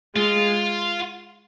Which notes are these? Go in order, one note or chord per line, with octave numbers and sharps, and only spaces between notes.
G#3 F4